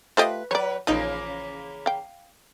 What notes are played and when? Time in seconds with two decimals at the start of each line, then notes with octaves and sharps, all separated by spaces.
0.17 A3 F4 G4 B4 C5 D#5 D#6
0.51 F#3 B4 C#5 D5
0.87 A#1 C#3 E3 F3 A#3 D#4 D#6
1.86 F5 G5